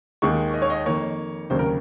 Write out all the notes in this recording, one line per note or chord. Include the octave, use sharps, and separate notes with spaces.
D#2 D#3 G#3 C#6
D#5
C#5
D#5
F2 D#3 A#3 C#5
F1 D#2 C#3 F#3 A#3 C5
A#4